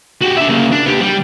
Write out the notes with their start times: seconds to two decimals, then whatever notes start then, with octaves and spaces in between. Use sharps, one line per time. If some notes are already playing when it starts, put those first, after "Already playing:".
0.21 F#4 G4
0.36 D4 E5
0.48 C#3 A#3
0.72 D4
0.86 B3 G4
1.01 G3